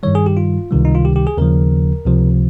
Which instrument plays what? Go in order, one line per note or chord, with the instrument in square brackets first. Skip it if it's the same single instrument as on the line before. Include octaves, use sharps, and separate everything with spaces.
[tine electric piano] G2 D#3 G3 C#5
G#4
G4
F4
C#2 C3 D#3 G3
D#4
F4
G4
G4
G#4
D#2 C#3 F3 A#4
C#2 C3 F3